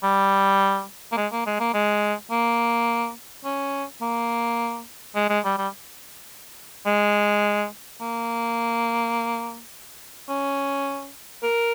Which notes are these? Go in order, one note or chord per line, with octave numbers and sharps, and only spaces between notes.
G3
A#3
G#3
A#3
G#3
A#3
G#3
A#3
C#4
A#3
G#3
G#3
G3
G3
G#3
A#3
C#4
A#4